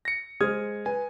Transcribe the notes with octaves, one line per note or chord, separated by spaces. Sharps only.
A#6 C#7
G#3 G#4 C5 D#6 F6 G#6
B4 G#5